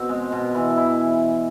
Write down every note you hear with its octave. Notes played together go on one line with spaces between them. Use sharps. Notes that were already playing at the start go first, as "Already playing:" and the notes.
Already playing: B2 C4
G#3
B2
E3
E4